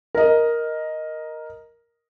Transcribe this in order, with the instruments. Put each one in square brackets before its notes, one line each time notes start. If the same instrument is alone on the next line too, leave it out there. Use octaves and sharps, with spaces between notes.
[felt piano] A#4 D#5